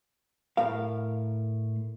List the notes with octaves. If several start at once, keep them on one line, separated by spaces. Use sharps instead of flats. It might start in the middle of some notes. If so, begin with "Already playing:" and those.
A2 A#4 F5